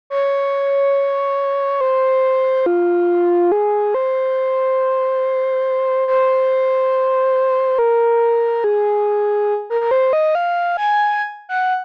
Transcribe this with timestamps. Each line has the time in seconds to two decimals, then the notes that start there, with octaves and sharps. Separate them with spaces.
0.10 C#5
1.81 C5
2.66 F4
3.52 G#4
3.94 C5
6.08 C5
7.79 A#4
8.64 G#4
9.70 A#4
9.81 A#4
9.91 C5
10.13 D#5
10.35 F5
10.77 G#5
11.49 F#5